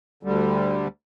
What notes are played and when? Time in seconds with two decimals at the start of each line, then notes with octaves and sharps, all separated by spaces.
0.23 D2 D3 G3